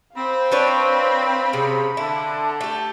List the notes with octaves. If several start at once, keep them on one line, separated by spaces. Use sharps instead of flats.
C4 C5 F5 B5
D4 B4 C#5
C3 C#4 G#4
D3 E4 A5
A3 G4